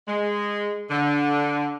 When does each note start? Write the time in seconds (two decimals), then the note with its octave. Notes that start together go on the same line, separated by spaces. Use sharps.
0.07 G#3
0.90 D3